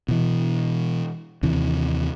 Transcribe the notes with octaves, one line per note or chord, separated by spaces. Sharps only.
B2 E3
D#2 C3 E3